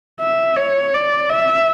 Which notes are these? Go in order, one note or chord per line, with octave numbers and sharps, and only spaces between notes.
E5
C#5
D5
E5